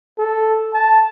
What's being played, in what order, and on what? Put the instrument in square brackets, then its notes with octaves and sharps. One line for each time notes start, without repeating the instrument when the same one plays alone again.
[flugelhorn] A4
A5